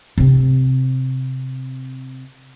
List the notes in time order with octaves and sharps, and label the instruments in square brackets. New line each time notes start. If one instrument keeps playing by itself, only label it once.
[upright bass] C3 C4